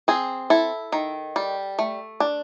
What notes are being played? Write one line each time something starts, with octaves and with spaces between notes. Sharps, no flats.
C4 G#4
E4 A4
D#3
G3
A3
D4